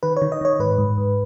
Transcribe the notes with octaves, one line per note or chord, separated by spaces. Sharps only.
D#3 B4
C#5
D#3
D#5
D#3 C#5
G#2 B4
G#2
G#2